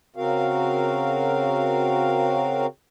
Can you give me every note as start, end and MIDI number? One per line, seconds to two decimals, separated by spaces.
0.16 2.66 49
0.16 2.66 60
0.16 2.66 66
0.16 2.66 70
0.16 2.66 77